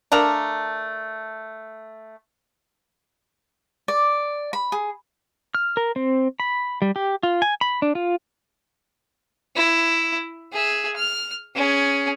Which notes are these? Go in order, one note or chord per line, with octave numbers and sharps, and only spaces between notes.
A3 D4 A#4 F5
D5
B5
G#4
F6
A#4
C4
B5
G3
G4
F4
G#5
B5
D4
F4
E4
G#4 E5
F6
C#4 G#4